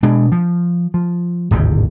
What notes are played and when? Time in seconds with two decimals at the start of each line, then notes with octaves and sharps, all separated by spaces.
0.03 B2 G#3 D4
0.32 F3
0.94 F3
1.51 D1 G#1 D#2 C3